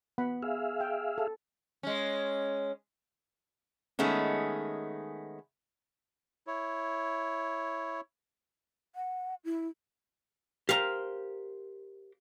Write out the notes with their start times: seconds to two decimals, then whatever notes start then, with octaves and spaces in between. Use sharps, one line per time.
0.18 B3 F#5 B5
0.42 G#4 E5 F5
0.80 G5
1.18 A4
1.83 G#3 C#4
3.99 D#3 G#3 A3 B3 C#4
6.47 E4 C#5
8.95 F#5
9.44 E4
10.69 G4 A#4 C5 F5 A#5